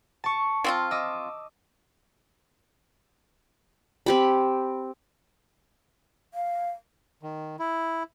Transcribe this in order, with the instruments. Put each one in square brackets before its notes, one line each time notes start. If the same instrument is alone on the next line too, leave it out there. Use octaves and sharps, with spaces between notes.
[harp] A5 C#6
[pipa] F3 C4 F4
[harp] D#5 D6 E6
[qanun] C4 G4 B5
[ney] F5
[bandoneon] D#3
E4